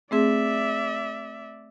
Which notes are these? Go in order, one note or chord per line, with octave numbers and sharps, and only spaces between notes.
A3 C4 G#4 D5 E5